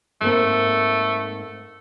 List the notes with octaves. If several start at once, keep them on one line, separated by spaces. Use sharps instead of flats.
G#2 A3 A#3 C4